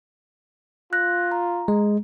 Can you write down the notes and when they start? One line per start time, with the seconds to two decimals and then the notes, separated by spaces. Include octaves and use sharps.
0.93 F4 F#6 A#6
1.31 A#5
1.68 G#3